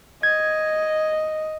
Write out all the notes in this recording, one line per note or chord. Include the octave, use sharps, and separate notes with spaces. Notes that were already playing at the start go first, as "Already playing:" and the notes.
D#5 G#6